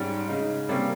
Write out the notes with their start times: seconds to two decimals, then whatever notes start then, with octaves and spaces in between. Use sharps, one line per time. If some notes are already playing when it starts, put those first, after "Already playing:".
Already playing: G#2 G3 C#4
0.28 C#3 G#3 D#4
0.69 C3 G3 A#3 C#4